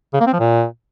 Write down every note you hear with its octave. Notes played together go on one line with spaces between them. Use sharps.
C#3
A#3
C4
F3
A#2